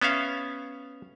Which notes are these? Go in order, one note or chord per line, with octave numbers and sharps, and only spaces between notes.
B3 C#4 E5 F5